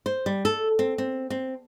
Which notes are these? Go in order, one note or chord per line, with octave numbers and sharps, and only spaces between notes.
C5
G3
A4
C4
C4
C4